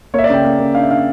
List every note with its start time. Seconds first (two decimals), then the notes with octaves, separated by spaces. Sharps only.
0.14 A#3 C#5
0.18 E5
0.24 D5
0.30 C#3 G5
0.44 A#3
0.59 A#3
0.75 D4 F5
0.82 E5
0.91 D4 F5